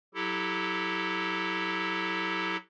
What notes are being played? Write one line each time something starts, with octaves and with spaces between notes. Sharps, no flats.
F#3 E4 G4 A4